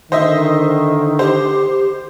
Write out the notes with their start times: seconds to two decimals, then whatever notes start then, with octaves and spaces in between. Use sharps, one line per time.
0.12 D3 D#3 C5 D#5 E5
1.19 G4 C5